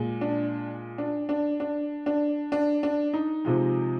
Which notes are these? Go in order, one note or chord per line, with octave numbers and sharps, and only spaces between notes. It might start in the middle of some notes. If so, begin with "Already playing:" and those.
Already playing: A#2 G#3
D4
D4
D4
D4
D4
D4
D4
D#4
C3 F3 G#3